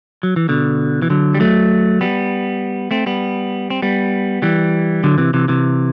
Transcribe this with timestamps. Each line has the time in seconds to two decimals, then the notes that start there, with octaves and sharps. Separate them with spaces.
0.23 F#3
0.36 E3
0.49 B2 D3
1.02 E3
1.10 D3 F#3
1.35 G3
1.40 F#3 A3
2.01 G3 B3
2.91 A3 C4
3.06 G3 B3
3.70 C4
3.82 G3 B3
4.42 E3 G3
5.04 D3 F#3
5.18 C3 E3
5.34 C3 E3
5.48 C3 E3